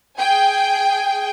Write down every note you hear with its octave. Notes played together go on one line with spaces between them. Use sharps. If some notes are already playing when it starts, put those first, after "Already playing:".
G#4 G5 G#5